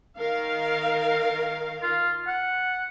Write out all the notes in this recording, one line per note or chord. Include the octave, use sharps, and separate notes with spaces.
D#3 A#4 F5
F4
F#5